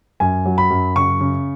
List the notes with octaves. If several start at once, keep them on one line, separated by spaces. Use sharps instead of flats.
F#2 G#5
F#3
B5
F#2
C#3 C#6
C#3